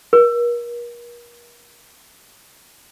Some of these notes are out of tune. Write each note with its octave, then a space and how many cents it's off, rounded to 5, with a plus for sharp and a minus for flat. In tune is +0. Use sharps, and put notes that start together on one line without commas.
A#4 +40